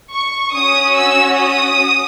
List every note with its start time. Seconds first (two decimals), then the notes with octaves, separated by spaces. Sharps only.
0.11 C#6
0.53 C#4 F#4 D#6
0.95 E6
1.37 D#6